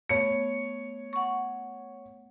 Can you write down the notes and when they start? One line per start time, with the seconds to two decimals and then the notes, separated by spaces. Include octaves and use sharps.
0.09 A3 B3 C#5 C#7
1.13 F#5 C#6